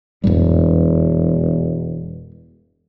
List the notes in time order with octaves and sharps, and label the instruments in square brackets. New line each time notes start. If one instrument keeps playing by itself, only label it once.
[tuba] E1 [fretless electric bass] F2 A2 G3